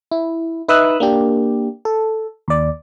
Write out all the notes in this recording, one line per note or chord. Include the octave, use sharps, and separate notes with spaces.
E4
D#4 B4 E5 D#6 E6 F#6
A#3 D4 G4
A4
D#2 D5